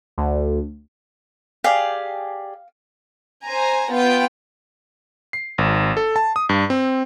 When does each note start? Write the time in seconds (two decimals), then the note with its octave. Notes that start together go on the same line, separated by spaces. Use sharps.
0.18 D2
1.64 G4 G#4 D5 F5
3.46 C5 G#5 A#5
3.91 B3 F4 G5
5.33 C7
5.58 G#1
5.97 A4
6.16 A5
6.36 D#6
6.49 G2
6.70 C4